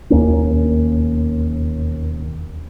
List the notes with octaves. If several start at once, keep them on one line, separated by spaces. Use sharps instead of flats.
E1 D#2 A#3 C#4